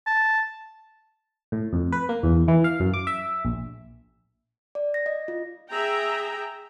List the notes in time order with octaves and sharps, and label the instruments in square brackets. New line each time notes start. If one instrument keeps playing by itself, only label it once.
[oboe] A5
[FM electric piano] A2
F2
B4
A#3
E2
E3
F5
F#2
D6
E5
A#1
[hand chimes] D5
A#6
D#5
F4
[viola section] G#4 E5 G5 A#5